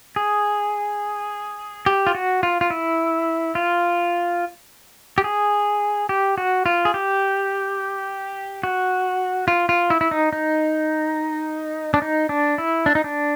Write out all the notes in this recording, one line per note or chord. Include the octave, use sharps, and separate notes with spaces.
G#4
G4
F4
F#4
F4
F4
E4
F4
G4
G#4
G4
F#4
F4
G#4
G4
F#4
F4
F4
E4
E4
D#4
D#4
D4
D#4
D4
E4
D4
D#4
D4